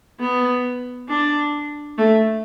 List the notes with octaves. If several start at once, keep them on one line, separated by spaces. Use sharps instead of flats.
B3
D4
A3